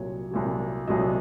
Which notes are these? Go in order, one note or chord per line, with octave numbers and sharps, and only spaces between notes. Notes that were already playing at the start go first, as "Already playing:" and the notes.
Already playing: C2 A#2 F#3 C#5
C2 A#2 F#3
C2 A#2 F#3 D#5